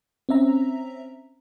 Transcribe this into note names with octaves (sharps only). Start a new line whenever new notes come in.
C4 C#4 E5 A#5